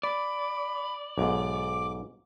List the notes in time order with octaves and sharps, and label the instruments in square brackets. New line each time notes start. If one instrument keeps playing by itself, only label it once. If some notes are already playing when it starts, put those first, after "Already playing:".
[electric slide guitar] D5 [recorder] B5
[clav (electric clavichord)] B1 G#2 [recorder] D6